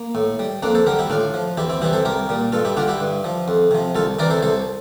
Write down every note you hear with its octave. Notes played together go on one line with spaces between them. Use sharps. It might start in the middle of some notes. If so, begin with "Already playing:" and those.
Already playing: A#3
A2
G3
F2 A#3 D4
A4 C5
D3 G3 G4 A#4
E4 G4
A2 D4 F4
F3
E2 E4 G4
C4 E4
C3 E3 G3 E4 G4
A4 C5
C2 G4 A#4
A#2 G3
G2 F4 A4
E4 G4
D3 G3 D4 F4
E4 G4
G2
F3
F2
C3 F3
C2 F4 A4
C3 E3 A#4 D5
A4 C5
C2 A4 C5